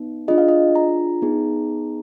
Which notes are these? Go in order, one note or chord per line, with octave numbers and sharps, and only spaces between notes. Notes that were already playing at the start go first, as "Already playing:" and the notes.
Already playing: B3 D#4
D4 F4 G#4 D#5
F5
D#5
A#5
B3 D#4 G#4